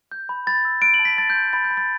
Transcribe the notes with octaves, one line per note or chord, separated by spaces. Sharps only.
G6
B5
B5 A6
E6
F#6 D7
F#7
A5
B6
A5 A6
G6
C6
B5 A6
G6
B5
A6